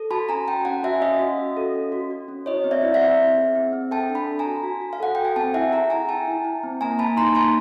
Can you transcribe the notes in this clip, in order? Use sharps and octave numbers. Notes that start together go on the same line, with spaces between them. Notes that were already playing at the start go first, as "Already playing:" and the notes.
Already playing: A4
F#4 A5 B5
C#4 G#5 A#5
C#4 G5 A5
C#4 F#5 G#5
F#4 E5 F#5
C#4 D#5 F5
F#4
C#4
A4
C#4
F#4
F#4
C#4
E4 C#5 D#5
C4
D5 E5
E4
E5 F#5
C4
C4
G#4
C4
C4
A4 G5 A5
D4
A5 B5
A4
G#5 A#5
F#4
F#4
F#4
F5
A4 F#5
A4 G5
G#5
C4 G5 A5
E4 E5 F#5
G#4 G#5 A#5
E4 G#5 A#5
E4 G5 A5
E4
E4
C4
A#3 G#5 A#5
A#3 A5 B5
D#4 A#5 C6
A#3 A5 B5